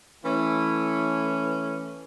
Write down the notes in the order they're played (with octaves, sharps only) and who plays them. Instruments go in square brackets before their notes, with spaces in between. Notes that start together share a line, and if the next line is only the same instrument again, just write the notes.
[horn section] E3 A3 C#4 E4